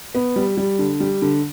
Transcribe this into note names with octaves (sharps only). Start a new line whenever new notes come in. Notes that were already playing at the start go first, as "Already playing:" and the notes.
B3
G3
G3
D3
G3
D3